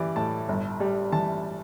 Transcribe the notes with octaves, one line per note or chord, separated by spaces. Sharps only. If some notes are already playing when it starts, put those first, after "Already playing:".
Already playing: E3 G3 D5
A2 A5
G1
G3
E3 A5